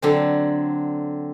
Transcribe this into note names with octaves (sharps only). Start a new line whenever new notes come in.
D3 F#3 C4